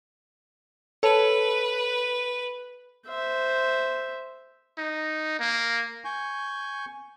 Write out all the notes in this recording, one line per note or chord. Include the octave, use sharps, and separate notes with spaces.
A4 B4 C#5 A5
C5 E5
D#4
A#3
G#5 C#6 G6